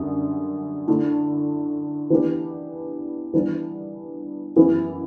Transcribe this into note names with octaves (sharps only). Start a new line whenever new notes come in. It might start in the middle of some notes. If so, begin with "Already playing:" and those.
Already playing: F#2 D3 G3
D3 A3 E4
E3 B3 D4 G4
E3 G3 B3 D4
F#2 E3 B3 E4 G4